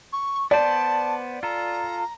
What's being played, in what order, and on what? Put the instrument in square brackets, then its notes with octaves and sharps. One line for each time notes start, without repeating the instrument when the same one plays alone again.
[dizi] C#6
[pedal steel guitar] B3 C5 [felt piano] D5 [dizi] A5
[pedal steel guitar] F4 A4 [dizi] A#5